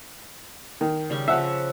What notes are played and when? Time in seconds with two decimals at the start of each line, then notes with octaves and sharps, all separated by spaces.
0.81 D#3
1.10 C#3 G3 C#6
1.28 C#3 F3 E5 F#5